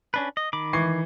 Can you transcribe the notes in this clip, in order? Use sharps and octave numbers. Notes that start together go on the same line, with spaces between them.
C#4 D4 B4
D#5
D#3 B5 D6
E3 C#6 C7